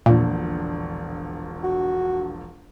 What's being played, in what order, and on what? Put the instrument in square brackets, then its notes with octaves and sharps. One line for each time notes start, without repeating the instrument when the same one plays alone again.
[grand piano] E1 A#1 D3 [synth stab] A#2
[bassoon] F#4